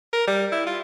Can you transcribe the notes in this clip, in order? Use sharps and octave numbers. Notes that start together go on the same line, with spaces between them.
A#4
G3
E4
F4